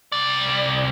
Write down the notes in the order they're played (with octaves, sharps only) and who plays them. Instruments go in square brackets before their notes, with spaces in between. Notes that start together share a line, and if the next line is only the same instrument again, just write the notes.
[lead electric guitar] C2 D5